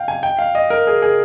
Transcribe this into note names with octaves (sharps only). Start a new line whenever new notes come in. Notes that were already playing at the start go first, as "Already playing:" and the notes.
Already playing: F5 G5
G#5
G5
F5
D#5
A#4
G#4
G#4